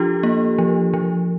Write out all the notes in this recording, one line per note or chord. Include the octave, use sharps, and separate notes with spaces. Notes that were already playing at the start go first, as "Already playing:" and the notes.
Already playing: F3 D4 F4 G4 A4
A#3
F3
F3